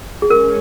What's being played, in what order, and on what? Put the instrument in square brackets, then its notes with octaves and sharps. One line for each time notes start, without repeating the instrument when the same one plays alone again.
[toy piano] G#4
[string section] G#3 C#4 [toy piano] A#4